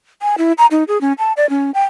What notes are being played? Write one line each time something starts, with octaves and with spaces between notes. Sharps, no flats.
G#5
E4
A#5
D#4
G#4
C#4
A5
D5
C#4
G5